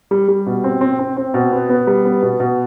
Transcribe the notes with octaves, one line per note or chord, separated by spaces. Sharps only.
G3
G3
B2
C4
C4
C4
C4
B2
B3
B3
G3
B3
B2
B2